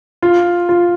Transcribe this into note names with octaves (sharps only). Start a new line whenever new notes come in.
F4
F4